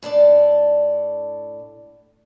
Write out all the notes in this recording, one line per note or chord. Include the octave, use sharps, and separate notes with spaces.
A2 D4 A4 D5